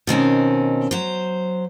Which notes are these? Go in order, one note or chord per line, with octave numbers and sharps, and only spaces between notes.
B2 D#3 C4 C#4
F#3 C5